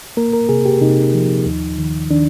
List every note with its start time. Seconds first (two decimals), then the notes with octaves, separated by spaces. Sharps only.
0.17 A#3 A#4
0.33 A#4
0.49 C3 G#4
0.66 G4
0.81 C3 D#4
1.14 F3
1.46 D#2
1.78 D#3
2.11 D#3 D4